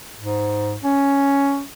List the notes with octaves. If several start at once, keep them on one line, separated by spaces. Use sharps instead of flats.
G#2
C#4